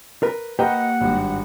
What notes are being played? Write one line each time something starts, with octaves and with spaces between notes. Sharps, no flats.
A#4 B4
A#3 G4 B4 D#5 F#5 G5 A#5
G#1 G2